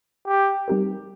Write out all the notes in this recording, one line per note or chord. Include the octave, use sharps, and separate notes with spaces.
G4
G3 C4 D#4 G4 A#4